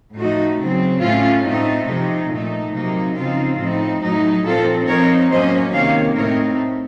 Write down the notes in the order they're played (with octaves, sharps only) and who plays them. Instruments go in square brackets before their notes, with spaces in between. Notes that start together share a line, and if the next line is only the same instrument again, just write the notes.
[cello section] A2 F3 A3 D#4 F#4
C#3 F#3 C4
A2 A3 C#4 F4
A2 A3 C4 D#4
C3 F3 A3 D#4
A#2 A3 D#4
C3 F#3 A#3 D#4
C#3 F3 C4 D#4 F4
A2 F3 C4 D#4
A2 F#3 A3 D#4
A#2 F3 C4 F4 A4
F3 C4 D#4 A#4 C#5
A2 F#3 A#3 C#4 C5 D#5
C3 D#3 A#3 C#5 F5
A2 A3 C4 D#4 A#4 C#5